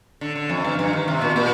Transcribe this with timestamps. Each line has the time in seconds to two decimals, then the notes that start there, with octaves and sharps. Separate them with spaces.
0.21 D3
0.36 D3
0.50 F2
0.65 G2
0.79 G2
0.93 D#3
1.08 C3
1.21 A#2
1.36 A#2